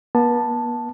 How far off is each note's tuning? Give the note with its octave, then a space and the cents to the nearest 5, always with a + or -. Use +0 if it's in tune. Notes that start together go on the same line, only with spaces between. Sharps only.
B3 -45 A5 +0